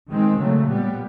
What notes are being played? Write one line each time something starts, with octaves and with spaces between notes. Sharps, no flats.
D#3 G#3 C4
C#3 F#3 A3
A#2 G3 B3